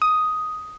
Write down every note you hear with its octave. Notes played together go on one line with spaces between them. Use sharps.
D#6